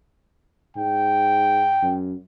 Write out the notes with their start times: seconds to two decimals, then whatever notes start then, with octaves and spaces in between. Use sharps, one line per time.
0.77 G#2 G5
1.82 F#2